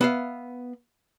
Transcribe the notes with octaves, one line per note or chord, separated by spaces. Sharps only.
B3 E5 F5